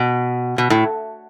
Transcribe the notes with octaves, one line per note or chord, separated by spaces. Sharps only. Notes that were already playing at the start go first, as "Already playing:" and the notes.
Already playing: B2
B2
A2